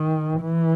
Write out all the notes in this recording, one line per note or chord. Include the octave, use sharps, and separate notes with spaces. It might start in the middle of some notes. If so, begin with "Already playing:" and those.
Already playing: D#3
E3